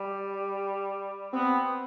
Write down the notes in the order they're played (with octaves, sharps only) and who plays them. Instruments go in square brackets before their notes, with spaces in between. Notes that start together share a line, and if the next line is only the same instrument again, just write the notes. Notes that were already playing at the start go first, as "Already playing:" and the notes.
Already playing: [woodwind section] G3
[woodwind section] B3 [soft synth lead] C4